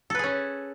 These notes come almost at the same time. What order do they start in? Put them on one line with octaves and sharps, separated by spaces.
A4 B4 G#4 C#4